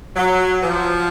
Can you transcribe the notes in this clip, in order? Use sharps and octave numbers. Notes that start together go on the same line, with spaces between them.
F#3
F3